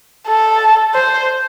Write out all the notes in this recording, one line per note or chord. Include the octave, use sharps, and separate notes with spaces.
A4
C5